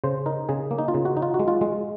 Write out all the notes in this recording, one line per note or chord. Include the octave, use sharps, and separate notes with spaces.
C#3 C5
D#4 A#4
C#3 G#4
A#3
D#4
F4
C#3
F#4
D#4
F4
F#4
G#3
F4
G#3